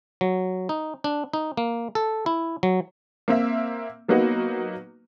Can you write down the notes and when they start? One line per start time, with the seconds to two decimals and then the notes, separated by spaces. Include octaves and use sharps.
0.21 F#3
0.69 D#4
1.04 D4
1.34 D#4
1.57 A#3
1.95 A4
2.26 E4
2.63 F#3
3.28 A#3 C4 E5
4.08 F#3 A#3 B3 D#4 F#4 B4